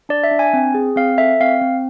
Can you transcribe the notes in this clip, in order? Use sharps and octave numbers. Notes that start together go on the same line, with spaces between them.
D4 D5
E5
D4
G#5
C4
G#4
C4 F5
A4 E5
C4 F5
C4